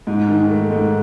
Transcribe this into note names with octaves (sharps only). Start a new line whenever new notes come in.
G#2
D#3
A3
G#2